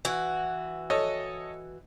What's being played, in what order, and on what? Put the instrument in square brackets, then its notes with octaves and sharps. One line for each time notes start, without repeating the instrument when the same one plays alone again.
[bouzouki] E3 F#4
[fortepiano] A4 C#5 D#5